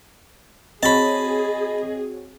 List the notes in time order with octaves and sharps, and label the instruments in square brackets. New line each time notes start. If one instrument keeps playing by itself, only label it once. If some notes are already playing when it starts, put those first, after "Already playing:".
[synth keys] C4 F#4 C#5 [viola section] G#4 [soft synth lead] D#5 [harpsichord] A5 B5